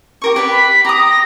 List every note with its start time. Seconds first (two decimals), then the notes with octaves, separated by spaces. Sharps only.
0.22 G4 A#4 C#6
0.36 G4 B4 D5
0.51 B5
0.85 G4 A#5 D#6
1.10 A#6